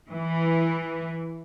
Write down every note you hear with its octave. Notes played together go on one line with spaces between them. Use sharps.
E3